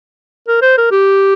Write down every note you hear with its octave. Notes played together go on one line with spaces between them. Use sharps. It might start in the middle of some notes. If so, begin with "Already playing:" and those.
A#4
C5
A#4
G4